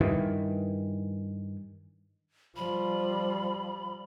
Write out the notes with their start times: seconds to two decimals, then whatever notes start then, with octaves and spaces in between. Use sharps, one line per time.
0.01 G2 D#3 E3
2.56 F3 G3 B5